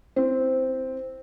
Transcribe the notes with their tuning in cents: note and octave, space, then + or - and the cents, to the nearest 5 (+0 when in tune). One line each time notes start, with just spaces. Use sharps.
C4 -5 E4 +0